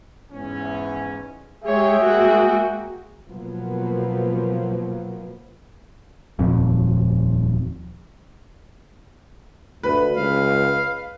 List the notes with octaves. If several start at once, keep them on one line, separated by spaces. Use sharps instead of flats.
E2 G#2 C#4
G#3 G4 G#4 C#5 E5 G5
G#3 A#3 F#4
B2 F3 F#3 A#3 B3
D#1 F2
D2 B4
C#2 F5